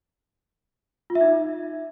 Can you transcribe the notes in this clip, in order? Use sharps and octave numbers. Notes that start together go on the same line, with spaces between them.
F4
E5
D#4